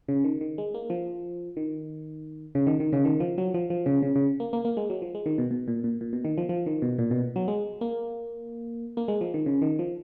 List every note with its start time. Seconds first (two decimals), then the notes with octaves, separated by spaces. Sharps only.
0.08 C#3
0.24 D#3
0.41 D#3
0.58 G#3
0.74 A#3
0.90 F3
1.57 D#3
2.55 C#3
2.67 D#3
2.80 D#3
2.93 C#3
3.05 D#3
3.20 F3
3.38 F#3
3.54 F3
3.70 F3
3.86 C#3
4.03 C#3
4.16 C#3
4.40 A#3
4.53 A#3
4.65 A#3
4.77 G#3
4.90 F#3
5.02 F3
5.15 G#3
5.26 D#3
5.38 B2
5.51 B2
5.68 A#2
5.84 A#2
6.01 A#2
6.13 B2
6.25 D#3
6.38 F3
6.49 F3
6.66 D#3
6.82 B2
6.99 A#2
7.11 B2
7.36 F#3
7.48 G#3
7.81 A#3
8.97 A#3
9.08 G#3
9.21 F3
9.34 D#3
9.46 C#3
9.62 D#3
9.79 F3